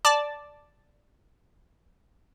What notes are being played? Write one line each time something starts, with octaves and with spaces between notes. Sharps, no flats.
D5 A5 D6